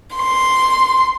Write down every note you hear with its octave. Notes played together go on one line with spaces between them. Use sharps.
C6